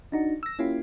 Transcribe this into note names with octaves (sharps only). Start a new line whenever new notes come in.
D4 D#4 F#4
E6 A#6
A#3 C#4 E4 F4 G4